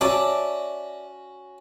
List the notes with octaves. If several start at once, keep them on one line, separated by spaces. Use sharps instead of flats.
C#4 F#4 D5 E5 A5